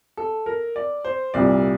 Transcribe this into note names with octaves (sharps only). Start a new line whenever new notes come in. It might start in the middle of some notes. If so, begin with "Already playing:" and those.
A4
A#4
D5
C5
C2 A#2 G3 D5